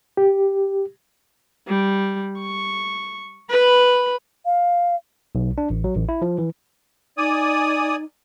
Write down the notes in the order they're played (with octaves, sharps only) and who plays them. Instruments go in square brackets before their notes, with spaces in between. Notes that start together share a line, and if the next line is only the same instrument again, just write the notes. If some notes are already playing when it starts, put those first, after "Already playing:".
[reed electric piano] G4
[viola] G3
C#6
B4 B5
[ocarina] F5
[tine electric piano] B1
D4
A1
F#3
A1
E4
F3
E3
[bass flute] D#4 [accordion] D5 G#5 D#6